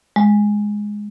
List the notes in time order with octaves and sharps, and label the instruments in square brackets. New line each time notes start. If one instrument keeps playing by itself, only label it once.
[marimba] G#3